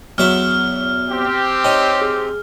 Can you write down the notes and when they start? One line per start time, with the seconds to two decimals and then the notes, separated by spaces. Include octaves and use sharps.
0.18 E2 F#3 E5 F6
1.10 C4 G4
1.65 D#4 C#5 G5
2.02 G#4